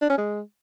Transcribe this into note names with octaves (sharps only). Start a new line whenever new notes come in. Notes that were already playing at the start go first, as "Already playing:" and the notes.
D4
C#4
G#3